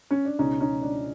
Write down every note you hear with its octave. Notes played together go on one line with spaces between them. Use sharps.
C#4
D4
C#2 B2 G#3 C#4 D#4
C#4 D#4
D4